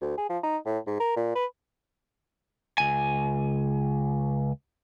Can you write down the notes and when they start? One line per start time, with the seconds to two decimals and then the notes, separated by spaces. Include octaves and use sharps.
0.01 D2
0.18 G#4
0.30 F3
0.43 D#4
0.66 A2
0.87 G#2
1.00 A#4
1.16 A#2
1.35 B4
2.78 C#2 G#5